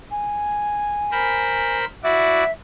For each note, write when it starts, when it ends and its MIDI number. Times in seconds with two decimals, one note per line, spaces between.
0.11 1.78 80
1.12 1.85 70
1.12 1.85 72
1.12 1.85 83
2.03 2.44 64
2.03 2.44 66
2.03 2.44 74
2.03 2.52 76